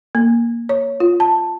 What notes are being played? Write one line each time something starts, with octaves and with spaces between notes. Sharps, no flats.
A#3
C#5
F4
A5